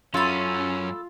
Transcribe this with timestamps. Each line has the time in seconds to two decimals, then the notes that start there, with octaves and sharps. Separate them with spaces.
0.14 F#2 C#4 F4 A4 B5